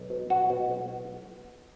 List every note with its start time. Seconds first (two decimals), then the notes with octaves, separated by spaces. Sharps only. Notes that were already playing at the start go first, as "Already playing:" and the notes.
Already playing: B1
0.10 B2
0.30 B2 F#4
0.50 B2
0.70 B1